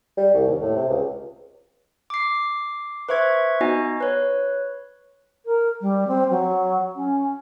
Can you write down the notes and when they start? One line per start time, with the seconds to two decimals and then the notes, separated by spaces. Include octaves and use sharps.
0.17 G3
0.34 C2
0.47 D#2
0.62 A2
0.76 C3
0.90 C#2
2.10 D6 C7
3.09 B4 C5 E5 C#6 G#6
3.60 B3 D#4 F#4 D#5 G#5
4.01 B4 C#5
5.46 A#4
5.81 G3
6.07 C4
6.30 F#3
6.96 C#4